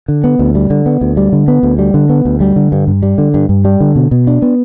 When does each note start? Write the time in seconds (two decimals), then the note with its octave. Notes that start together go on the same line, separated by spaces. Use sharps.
0.08 D3
0.24 B3
0.39 D2
0.55 G3
0.70 D3
0.86 B3
1.01 D2
1.17 G3
1.32 D3
1.48 B3
1.63 D2
1.79 G3
1.94 D3
2.09 B3
2.25 D2
2.41 G3
2.56 D3
2.72 G2
2.87 G2
3.03 G3
3.18 D3
3.34 G2
3.49 G2
3.65 G3
3.80 D3
3.96 B2
4.11 B2
4.27 D4
4.42 B3